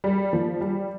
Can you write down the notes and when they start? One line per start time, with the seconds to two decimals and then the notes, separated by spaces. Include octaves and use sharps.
0.04 G3
0.33 F3
0.61 G3